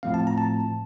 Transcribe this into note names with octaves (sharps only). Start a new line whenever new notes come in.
A2 F3 A3 C4 F5
A5
A#5
A5